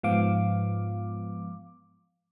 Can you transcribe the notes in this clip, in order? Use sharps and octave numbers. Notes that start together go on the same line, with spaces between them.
G#2 F3 B3 F5 D6